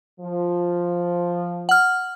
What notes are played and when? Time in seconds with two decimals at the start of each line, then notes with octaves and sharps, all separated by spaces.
0.20 F3
1.69 F#5 F6